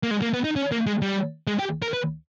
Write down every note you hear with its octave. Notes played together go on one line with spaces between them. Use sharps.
A#3
G#3
A#3
B3
D#4
C#4
A#3
G#3
G3
G#3
G4
A#4
B4